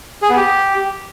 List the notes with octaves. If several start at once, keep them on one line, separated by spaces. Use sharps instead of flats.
G#4
B3
G4